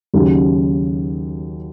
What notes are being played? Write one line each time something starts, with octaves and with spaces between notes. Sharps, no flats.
D#2 C#3 F#3